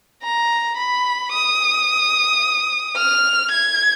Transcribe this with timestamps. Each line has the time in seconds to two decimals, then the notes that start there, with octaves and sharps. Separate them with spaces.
0.23 A#5
0.77 B5
1.33 D#6
2.96 F6
3.51 G#6